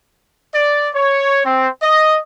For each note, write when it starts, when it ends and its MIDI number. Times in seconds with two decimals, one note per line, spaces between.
0.55 0.89 74
0.94 1.40 73
1.46 1.68 60
1.82 2.19 75